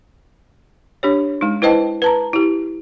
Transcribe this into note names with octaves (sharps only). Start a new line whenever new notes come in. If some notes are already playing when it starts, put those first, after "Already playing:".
D4 G4 C#5
G#3 D#4
E4 B4 C5 D#5 G5 A5
B4 A5 A#5
E4 G4